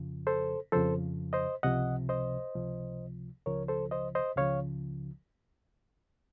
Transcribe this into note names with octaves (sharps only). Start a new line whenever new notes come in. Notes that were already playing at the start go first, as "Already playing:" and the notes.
Already playing: F2 C#3 F3
A4 C5
F2 C#3 F3 A4 C5
C5 D#5
C#2 C3 F3 D#5 F#5
C5 D#5
C#2 C3 F3
C#2 C#3 F3 A#4 C#5
A4 C5
C5 D#5
C5 D#5
C#2 C#3 F3 C#5 F5